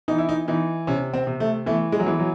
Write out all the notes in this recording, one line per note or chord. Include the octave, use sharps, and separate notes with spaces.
E3 D#4
E4
D#4
E3 D#4
C3 C#4
C4
C3
A3
E3 A3
G#3
F#3
E3 G#3
F#3